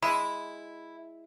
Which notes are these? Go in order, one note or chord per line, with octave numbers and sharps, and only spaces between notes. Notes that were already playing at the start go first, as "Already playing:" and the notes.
G#3 E4 B5